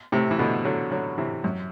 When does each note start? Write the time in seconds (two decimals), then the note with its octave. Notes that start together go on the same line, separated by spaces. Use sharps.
0.12 A2 C3
0.31 E3
0.39 B2 D3
0.65 D3 F#3
0.91 D3 F#3
1.18 C3 E3
1.44 F#2